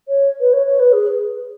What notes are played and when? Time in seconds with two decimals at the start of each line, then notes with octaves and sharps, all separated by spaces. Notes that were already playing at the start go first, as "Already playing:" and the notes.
0.08 C#5
0.40 B4
0.53 C#5
0.66 C#5
0.79 B4
0.93 G#4